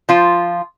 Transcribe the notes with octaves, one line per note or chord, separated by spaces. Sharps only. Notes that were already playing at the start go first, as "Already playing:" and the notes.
F3 F4